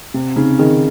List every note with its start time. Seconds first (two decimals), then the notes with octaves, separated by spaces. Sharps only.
0.14 C3 C4
0.36 C#3 D#4
0.59 D#3 G#4